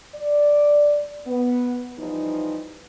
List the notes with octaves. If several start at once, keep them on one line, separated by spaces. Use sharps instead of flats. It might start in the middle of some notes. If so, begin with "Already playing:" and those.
D5
B3
E3 F3 G3 D#4